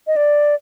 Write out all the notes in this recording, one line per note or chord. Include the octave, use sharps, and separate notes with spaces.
D#5
D5